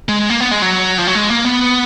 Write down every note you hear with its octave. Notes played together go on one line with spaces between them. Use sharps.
G#3
A#3
B3
G#3
F#3
F3
F#3
G#3
A#3
B3